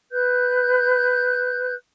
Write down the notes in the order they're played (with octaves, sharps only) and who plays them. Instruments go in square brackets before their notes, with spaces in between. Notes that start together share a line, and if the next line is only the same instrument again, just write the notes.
[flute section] B4 F#6 G6